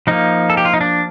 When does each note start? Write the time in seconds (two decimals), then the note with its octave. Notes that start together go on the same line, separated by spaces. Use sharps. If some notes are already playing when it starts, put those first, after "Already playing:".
0.07 F3 A#3 D#4
0.50 A4
0.57 G4
0.65 F4
0.73 D#4
0.81 D4